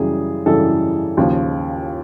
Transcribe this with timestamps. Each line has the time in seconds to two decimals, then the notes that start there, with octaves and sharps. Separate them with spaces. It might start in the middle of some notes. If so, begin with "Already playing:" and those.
Already playing: F#2 C#3 E3 G3 G#4
0.46 F#2 C#3 E3 G3 A4
1.17 D#2 C#3 F3